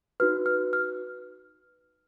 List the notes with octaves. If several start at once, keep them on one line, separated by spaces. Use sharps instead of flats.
D#4 F#4 B4 F6
F6
F6